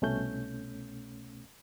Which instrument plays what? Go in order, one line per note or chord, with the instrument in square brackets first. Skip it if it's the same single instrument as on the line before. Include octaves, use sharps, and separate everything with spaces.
[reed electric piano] C2 B2 A3 C#4 G6